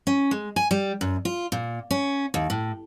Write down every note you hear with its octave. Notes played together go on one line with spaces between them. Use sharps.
C#4
G#3
G#5
G3
F#2
F4
A#2
C#4
D#2
A2